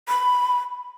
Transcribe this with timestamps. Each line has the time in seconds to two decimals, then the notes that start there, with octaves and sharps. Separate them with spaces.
0.08 B5